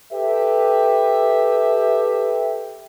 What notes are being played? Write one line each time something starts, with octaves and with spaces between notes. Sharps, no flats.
G4 A4 B4 E5